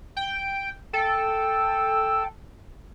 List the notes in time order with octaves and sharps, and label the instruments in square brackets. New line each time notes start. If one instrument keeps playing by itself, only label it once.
[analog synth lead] G5
[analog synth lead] A4 [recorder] G5